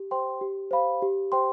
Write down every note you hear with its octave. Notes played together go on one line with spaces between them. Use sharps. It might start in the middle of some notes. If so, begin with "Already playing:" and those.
Already playing: G4
C5 G5 C6
G4
C5 F5 B5
G4
C5 G5 C6